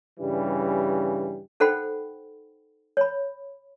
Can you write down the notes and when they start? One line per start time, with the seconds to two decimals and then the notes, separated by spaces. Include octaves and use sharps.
0.19 G2 C#3 E3 G3
1.60 D#4 A4 C5 F#5 G5 B5
2.97 C#5 B5